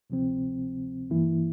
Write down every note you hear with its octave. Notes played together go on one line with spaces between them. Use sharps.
D2 C3 F3 C4
G2 E3 A#3 E4